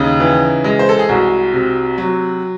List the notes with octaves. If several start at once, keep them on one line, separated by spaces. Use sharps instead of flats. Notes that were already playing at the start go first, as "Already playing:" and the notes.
Already playing: D#2 C#3 D#4
E3
G#3
C5
A4
G#4
C2 F#4
C3
F#3